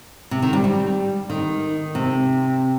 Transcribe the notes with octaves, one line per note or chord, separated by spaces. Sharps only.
C3
D#3
G3
G3
D#3
C3